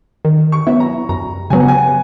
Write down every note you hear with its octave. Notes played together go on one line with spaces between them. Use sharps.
D#3
C#6
F#3 B3 E4
A#5
F#2 A#5
C#3 F#3 B3 G#5
F#5
G#5